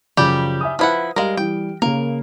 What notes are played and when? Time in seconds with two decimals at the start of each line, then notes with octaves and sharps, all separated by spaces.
0.17 F#2 C#3 F3 G3 G4
0.61 E5 G#5 D#6
0.79 F3 E4 B4 F#5 F6
1.16 G3 G#3 A#4 F5
1.37 E3 G3 G5
1.82 C#3 A#3 A#4